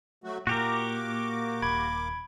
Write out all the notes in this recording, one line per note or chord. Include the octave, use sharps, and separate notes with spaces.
F#3 A3 F#4
A#2 A#3 F#4 G4 A#4 D6
D#1 B5 G#6 D7